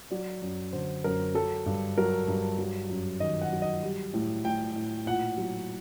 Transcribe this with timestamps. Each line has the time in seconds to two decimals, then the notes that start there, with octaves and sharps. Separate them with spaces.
0.11 F#3 D5
0.42 F#2
0.73 D3 C5
1.04 F#2 A#4
1.35 F#3 A4
1.66 G2
1.98 F#3 A#4
2.28 G2
2.58 F#3
2.89 F#2
3.20 D#3 D#5
3.41 F#5
3.52 F#3
3.62 D#5
3.83 G3
4.14 A2
4.44 A2 G5
4.76 A2
5.06 A#2 F#5
5.38 F#3